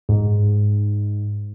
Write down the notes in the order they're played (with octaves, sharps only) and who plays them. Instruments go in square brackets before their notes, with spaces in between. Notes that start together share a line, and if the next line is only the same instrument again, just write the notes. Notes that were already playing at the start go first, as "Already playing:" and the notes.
[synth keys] G#2